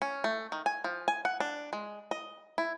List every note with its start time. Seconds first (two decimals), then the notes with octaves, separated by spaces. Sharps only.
0.02 C#4
0.24 A3
0.52 D#3
0.66 G#5
0.84 F3
1.08 G#5
1.25 F#5
1.40 D4
1.73 G#3
2.11 D#5
2.58 E4